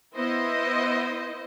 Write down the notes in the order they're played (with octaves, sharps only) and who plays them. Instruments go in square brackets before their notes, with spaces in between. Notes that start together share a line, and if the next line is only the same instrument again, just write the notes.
[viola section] B3 E4 C5 D#5